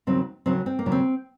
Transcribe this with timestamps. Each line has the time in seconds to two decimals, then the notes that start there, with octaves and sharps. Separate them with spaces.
0.07 D#2 C#3 F#3 C4
0.46 D#2 C#3 F#3 C4
0.66 C4
0.79 A#3
0.86 D#2 C#3 F#3
0.92 C4